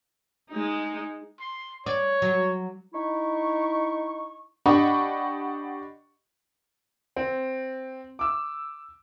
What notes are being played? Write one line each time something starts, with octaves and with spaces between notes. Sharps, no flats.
G#3 D#4
C6
C#5 D5
F#3
D#4 E4 C#6
D4 G4 D#5 F#5 B5 C#6
C4
D6 E6